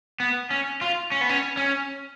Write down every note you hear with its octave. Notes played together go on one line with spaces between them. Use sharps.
B3
C#4
F4
C#4
B3
C#4
C#4